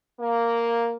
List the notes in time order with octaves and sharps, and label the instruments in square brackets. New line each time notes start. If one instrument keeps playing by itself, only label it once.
[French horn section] A#3